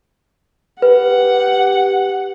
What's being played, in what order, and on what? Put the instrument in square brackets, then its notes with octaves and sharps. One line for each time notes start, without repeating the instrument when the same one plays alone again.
[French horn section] G4 [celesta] B4 [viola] F#5